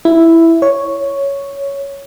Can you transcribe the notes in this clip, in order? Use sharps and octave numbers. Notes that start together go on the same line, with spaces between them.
E4
C#5